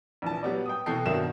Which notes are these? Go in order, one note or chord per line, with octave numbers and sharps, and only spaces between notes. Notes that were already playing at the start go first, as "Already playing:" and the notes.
A#1 E3 A5
F#3 G3 B3 D5
G5 D#6
B2 E3 F#4 A4 G5 C7
G2 B2 D#3 F#3 E5 E7